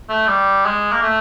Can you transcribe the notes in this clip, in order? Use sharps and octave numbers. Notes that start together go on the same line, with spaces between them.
A3
G3
G#3
A#3
A3